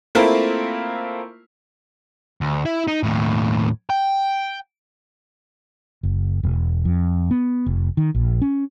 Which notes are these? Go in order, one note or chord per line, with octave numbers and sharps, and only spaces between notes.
A3 A#3 C4 E4 F4 A#4
D2
E4 E5
D#4
D#2 A2
G5
F#1
E1
F2
B3
F1
D#3
A#1
C#4